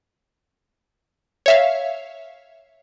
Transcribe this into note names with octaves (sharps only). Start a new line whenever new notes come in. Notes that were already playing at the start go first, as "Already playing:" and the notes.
C#5 E5 F5